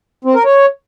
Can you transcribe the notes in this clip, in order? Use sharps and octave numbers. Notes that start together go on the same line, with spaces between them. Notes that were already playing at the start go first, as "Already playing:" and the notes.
C4
A#4
C#5